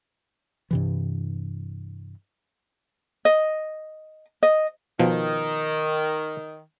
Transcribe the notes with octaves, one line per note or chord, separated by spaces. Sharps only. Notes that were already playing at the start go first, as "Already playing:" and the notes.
G2 C3 E3
D#5
D#5
B2 D#3 F3